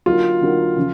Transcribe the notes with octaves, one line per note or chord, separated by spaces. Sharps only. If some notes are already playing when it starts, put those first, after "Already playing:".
D3 F#3 A#3 D#4 F4
D3 F#3 A#3 D#4
C#3 F3